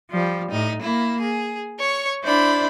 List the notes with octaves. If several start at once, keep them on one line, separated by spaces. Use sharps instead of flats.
F3 G3
A2 D#4
A#3 E4
G#4
C#5 C#6
D4 E4 C5 D5 B5